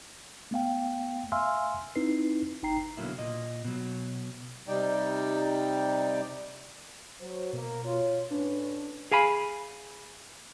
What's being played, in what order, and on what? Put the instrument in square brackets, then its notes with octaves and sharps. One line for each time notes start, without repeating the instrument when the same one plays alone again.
[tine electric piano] A3 B3 F5 G5
E5 F5 G#5 C6 E6 F6
C4 D#4 E4 B4 C7
G1 D#4 G5 A#5 C7
[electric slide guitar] B2 D3 E3 F#3 A#3 E4
A#2 D#5
B2 F#3
[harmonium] C3 G3 D#4 D5 G5
[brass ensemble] F#3 C5
[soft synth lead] B2 [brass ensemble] A#3 A#4
[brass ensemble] F4 C#5
[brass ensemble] A2 C#4 B4 [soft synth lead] D4
[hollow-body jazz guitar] G#4 F5 G#5 B5